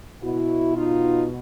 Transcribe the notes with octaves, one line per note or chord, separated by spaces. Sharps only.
B2 E4 F#4
D#4 F4